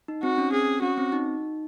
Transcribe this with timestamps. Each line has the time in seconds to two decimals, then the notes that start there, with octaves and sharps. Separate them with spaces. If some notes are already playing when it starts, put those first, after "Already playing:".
0.08 D#4
0.23 C4 F#4
0.38 C#4
0.52 C4 G#4
0.82 C#4 F#4
0.98 C4
1.12 D#4